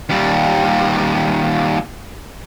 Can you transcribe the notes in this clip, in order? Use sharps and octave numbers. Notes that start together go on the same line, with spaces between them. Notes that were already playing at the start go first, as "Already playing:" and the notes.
D#2 G3